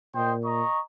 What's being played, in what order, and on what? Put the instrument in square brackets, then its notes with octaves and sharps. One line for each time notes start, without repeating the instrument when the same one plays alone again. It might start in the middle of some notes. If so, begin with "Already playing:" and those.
[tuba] A#2 [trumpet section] C5 D#5 G5
[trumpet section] D#5 A#5 C#6